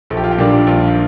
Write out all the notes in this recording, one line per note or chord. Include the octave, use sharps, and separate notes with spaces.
A#1 A4
G4
F4
G4
A#2 G3 A#3 D4
A#1 F4